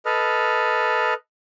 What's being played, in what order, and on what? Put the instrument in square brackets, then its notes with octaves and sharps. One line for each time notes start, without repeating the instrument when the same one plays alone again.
[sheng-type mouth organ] A4 B4 D#5 F6